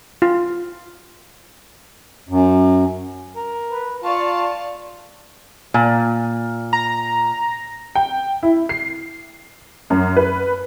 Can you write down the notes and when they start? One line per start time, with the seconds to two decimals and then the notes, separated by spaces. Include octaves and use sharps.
0.22 F4
2.29 F#2
3.36 A#4
3.71 B4
4.03 F4 D5 F5 A5 C#6
5.74 A#2
6.73 A#5
7.95 G5
8.43 E4
8.69 C7
9.90 F#2
10.17 B4